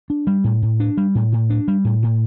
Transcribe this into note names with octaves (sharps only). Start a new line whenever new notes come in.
D4
G3
A2
A2
D4
G3
A2
A2
D4
G3
A2
A2